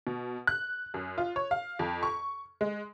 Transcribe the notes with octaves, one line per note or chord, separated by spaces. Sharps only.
B2
F#6
F#2
F4
C#5
F5
F2
C#6
G#3